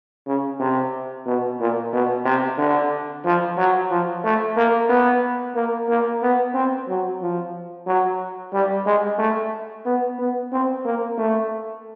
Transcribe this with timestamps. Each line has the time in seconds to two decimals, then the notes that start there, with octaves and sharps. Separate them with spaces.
0.27 C#3
0.60 C3
1.26 B2
1.60 A#2
1.93 B2
2.25 C3
2.58 D3
3.25 F3
3.57 F#3
3.91 F3
4.24 A3
4.56 A#3
4.89 B3
5.55 A#3
5.89 A#3
6.22 B3
6.54 C4
6.89 F#3
7.21 F3
7.87 F#3
8.53 G3
8.86 G#3
9.19 A3
9.86 B3
10.19 B3
10.52 C4
10.85 A#3
11.18 A3